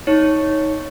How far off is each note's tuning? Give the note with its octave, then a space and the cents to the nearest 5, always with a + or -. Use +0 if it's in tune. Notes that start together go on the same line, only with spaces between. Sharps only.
D#4 +15 C#5 +0